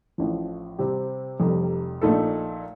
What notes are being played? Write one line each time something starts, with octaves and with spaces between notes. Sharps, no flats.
A1 A2 F3
C3 G3 C4 G4
F1 F2 C3 G3
A#1 A#2 A3 D#4 A4